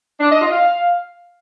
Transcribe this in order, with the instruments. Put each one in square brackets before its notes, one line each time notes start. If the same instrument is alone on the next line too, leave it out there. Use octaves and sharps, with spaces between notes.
[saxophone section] D4
D#5
F4
F5